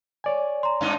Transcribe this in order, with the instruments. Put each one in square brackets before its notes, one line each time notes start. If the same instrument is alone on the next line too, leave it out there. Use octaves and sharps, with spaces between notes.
[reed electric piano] C#5 D5 G#5
[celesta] A#5 C6
[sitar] G2 D4 D#4